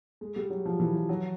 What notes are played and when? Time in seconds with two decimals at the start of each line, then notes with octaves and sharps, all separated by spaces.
0.21 G#3
0.36 G3
0.50 F#3
0.65 F3
0.80 E3
0.95 F3
1.09 F#3